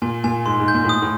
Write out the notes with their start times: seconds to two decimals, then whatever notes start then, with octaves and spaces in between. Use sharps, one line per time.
0.02 A#2 G#5
0.24 A#2 G#5
0.46 G#2 C6
0.60 G#2
0.68 G6
0.74 A#2
0.85 A2
0.89 D#6
1.02 A2